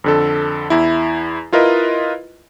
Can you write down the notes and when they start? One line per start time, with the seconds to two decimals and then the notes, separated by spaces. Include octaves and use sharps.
0.04 F2 D3 A4
0.70 E2 E4
1.53 E4 F4 A#4 B4 D#5